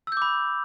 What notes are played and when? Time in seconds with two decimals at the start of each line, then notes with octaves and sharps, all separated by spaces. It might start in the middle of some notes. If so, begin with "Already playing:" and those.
0.07 E6
0.12 G6
0.17 D6
0.22 B5